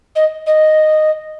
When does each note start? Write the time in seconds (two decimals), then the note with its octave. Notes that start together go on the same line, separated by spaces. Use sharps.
0.15 D#5
0.46 D#5